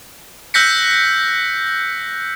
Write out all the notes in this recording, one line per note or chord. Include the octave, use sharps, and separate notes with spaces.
E6 F#6 G6 A#6 B6 C#7